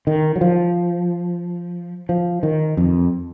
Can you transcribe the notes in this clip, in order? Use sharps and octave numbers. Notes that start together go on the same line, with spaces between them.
D#3
F#3
F3
F3
D#3
F2